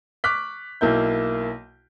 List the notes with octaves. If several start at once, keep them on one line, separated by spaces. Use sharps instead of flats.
C#6 D6 F6 F#6 B6
B1 A#3 E4 G6